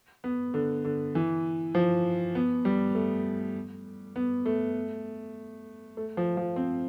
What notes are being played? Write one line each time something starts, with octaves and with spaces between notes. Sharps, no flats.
B3
D3
D3
E3
F3
B3
G3
A3
B3
A3
A3
F3
F3
C4